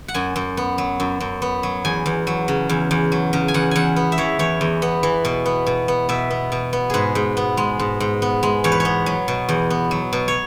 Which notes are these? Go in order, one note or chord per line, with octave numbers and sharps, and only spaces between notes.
F#5
F#2 G#5
F#2
B3
F#3
F#2
F#2
B3
F#3
E2 G#5
E2
F#3
C#3
E2
E2
F#3
C#3
G#5
E2 F#5
E2 F#5 G#5
B3
E5
E3 C#5
E2 C#5
E2
B3
E3
B2
B3
B2
B3
B2 E5
B3
B2
B3
G#2 G#4 B4
G#2
B3
G#3
G#2
G#2
B3
G#3
E2 C#5
B4
C#5
B3
F#3
B2
E2
B3
F#3
B2
C#5